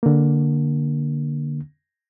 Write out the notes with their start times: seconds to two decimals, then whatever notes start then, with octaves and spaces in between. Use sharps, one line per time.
0.03 D3 A#3